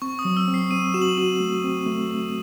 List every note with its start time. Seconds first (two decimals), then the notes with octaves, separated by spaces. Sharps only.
0.02 C4 C#6
0.19 D#6
0.25 F#3
0.37 E6
0.47 C4
0.54 C7
0.71 C4 D#7
0.94 F#4 E7
1.02 F#7
1.08 E7
1.18 F#4 D#7
1.40 A3
1.64 C4
1.86 A3
2.10 A3